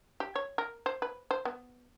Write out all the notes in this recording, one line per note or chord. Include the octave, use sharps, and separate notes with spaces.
G4
C#5
A#4
C5
B4
C5
B3